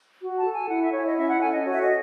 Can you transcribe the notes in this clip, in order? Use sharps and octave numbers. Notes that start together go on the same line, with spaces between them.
F#4
A5
A4
G#5
E4 F#5
E5
E4 C#5
D#5
C#4 E5
F#5
A4 G#5
D#5
F#4 C#5
E5
D#5